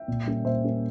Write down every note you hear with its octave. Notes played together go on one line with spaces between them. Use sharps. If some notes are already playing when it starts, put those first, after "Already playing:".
Already playing: E5 G5
A#2
G3 A#3 C#4
A#2 C5 E5
G3 A#3 C#4